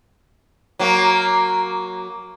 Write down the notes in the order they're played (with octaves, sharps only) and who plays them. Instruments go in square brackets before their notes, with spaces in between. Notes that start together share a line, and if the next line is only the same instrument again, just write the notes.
[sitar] F#3 A#3